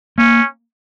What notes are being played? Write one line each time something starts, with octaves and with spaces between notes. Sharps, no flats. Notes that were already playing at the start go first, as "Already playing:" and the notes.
A#3 C#4